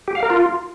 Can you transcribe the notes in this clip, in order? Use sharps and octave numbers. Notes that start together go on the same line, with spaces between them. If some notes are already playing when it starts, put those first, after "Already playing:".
G4
F5
A#4
F4